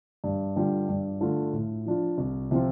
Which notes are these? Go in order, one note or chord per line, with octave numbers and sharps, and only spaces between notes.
G2
D3 G3 F4
G2
D3 A3 F4
A2
F3 D4 F4
C2
C3 F3 C4 F4